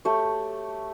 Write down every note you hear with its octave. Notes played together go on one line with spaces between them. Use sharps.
A3 G4 C#5